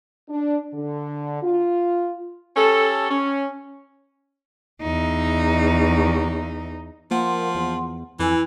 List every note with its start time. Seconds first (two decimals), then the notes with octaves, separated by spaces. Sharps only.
0.30 D4
0.73 D3
1.42 F4
2.56 C#4 G4 A4
3.11 C#4
4.81 E2 D#4
7.11 F3 A#3 F#5 C6
7.55 E2
8.19 F2 E3 E4 G#5